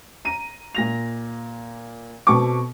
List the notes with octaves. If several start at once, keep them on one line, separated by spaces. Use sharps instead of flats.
A#5 D#7
A#2 A#6 F7
B2 C4 A4 C#6 D6